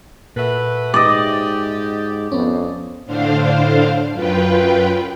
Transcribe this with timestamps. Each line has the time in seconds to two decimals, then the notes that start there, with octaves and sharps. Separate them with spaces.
0.36 A#2 F#4 A4 B4 E5
0.94 G#2 G4 D5 D#5
2.32 F2 B3 C#4
3.06 A2 D3 D4 C5 F5
4.12 F#2 F4 B4 G5